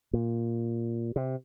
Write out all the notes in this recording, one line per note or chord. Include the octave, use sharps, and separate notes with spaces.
A#2
C3